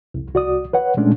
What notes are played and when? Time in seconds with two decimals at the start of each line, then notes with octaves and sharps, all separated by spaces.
0.14 C2 F2
0.34 C2 F#4 D5 D#6
0.73 B4 C#5 F#5
0.97 A#2 G#3 A3 C#4 D4